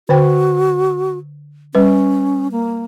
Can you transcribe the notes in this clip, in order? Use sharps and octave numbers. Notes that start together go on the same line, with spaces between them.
D3 F#4 C5 G5
G3 C#4 B4
A#3